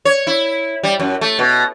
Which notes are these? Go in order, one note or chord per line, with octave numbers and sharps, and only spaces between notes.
C#5
E4
G3
F#2
A3
B2